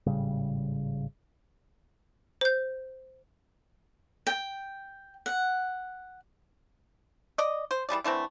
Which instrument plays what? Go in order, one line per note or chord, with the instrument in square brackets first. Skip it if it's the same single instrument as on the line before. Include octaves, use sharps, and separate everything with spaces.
[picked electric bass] G#1 A2 C#3 G3
[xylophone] C5 G6
[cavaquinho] G5
F#5
[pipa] D5 D#5
C5
E3 G3 G#4 D5
D3 E3 A3 C4